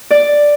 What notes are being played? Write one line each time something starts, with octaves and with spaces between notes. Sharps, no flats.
D5